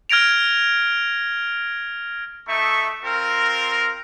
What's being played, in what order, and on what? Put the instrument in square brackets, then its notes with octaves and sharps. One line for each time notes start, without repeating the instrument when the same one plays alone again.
[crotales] F6 G#6 A#6 D7 F7
[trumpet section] A3 D#4 E5 C#6
C4 F4 A#4